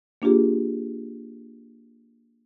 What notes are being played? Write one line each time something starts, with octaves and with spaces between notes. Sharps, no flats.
A#3 D4 F4 G4 G#4